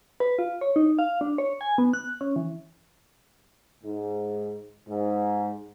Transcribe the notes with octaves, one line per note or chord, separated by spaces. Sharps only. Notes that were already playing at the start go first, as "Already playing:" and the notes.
B4
F4
C#5
D#4
F5
D4
C#5
G#5
B3
F#6
C#4
E3
G#2
G#2